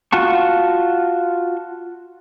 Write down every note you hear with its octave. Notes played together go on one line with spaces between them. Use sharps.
F4 F#4 A5 C#6